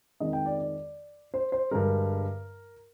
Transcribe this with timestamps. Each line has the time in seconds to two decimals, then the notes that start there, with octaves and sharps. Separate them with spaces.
0.20 F2 D#3 G#3 D#5
0.33 G5
0.46 D5
0.58 D5
1.34 C5
1.52 C5
1.71 G2 D3 G#3 A#4